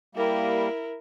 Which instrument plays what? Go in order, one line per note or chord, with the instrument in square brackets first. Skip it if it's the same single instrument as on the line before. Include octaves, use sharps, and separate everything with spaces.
[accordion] G3 A#3 [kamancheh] E4 A#4